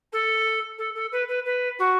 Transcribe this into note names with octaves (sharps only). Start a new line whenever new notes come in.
A4
A4
A4
B4
B4
B4
F#4